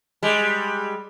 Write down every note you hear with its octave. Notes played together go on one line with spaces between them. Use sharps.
G3 G#3